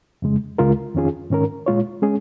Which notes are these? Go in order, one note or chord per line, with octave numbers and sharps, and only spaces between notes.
F2 C#3 G#3
C#2 C#3 G#3 F4 A#4
F2 D#3 C#4 F4 G#4
G#2 D#3 C#4 A#4
A#2 G#3 F4 C#5
G#3 C#4 G#4